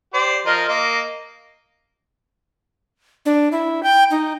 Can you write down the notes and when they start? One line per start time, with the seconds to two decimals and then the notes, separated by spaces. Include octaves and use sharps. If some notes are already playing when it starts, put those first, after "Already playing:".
0.14 G4 C5 D5
0.46 F3 A#4 D#5
0.69 A#3 D#5
3.26 D4
3.52 E4
3.83 G5
4.11 D#4